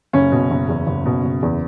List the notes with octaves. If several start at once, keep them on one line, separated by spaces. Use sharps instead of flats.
F#1 C#4
B2
F#1
E2
F#1
B2
F#1
E2